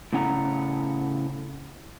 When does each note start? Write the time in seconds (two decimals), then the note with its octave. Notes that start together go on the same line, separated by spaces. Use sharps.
0.13 A2 C#3 C#4 F#5 A#5